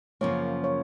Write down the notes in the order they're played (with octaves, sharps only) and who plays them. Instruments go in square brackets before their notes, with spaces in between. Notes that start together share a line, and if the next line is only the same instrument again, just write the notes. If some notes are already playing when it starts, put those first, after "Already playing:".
[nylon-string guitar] F#2 C#3 F3 A#3 [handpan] C#5
[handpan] C#5